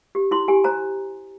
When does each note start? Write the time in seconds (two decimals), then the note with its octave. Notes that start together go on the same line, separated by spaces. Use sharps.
0.15 G4
0.31 E4 C6
0.48 G4 G#5
0.64 C5 A#5